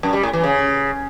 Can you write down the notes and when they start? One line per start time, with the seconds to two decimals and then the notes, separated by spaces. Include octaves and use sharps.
0.03 F#2
0.13 G3
0.23 A2
0.33 E3
0.44 C#3